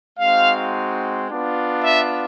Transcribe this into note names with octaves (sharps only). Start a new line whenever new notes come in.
G#3 C4 D#4 F#4 F5
B3 D4 F4
E5